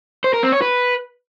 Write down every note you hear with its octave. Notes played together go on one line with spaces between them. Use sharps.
C5
A#4
C4
C#5
B4